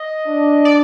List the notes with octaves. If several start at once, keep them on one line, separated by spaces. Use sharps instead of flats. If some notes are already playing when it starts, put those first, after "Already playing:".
Already playing: D#5
D4
D5